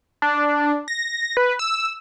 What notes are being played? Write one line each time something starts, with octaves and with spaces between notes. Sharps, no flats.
D4
A#6
B4
E6